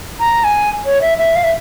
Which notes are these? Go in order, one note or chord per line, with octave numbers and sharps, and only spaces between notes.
A#5
G#5
C#5
E5
E5
F5
E5